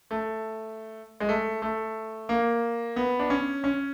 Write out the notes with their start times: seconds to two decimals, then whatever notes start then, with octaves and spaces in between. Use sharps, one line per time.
0.11 A3
1.20 G#3
1.29 A3
1.62 A3
2.29 A#3
2.96 B3
3.19 D4
3.30 C#4
3.64 C#4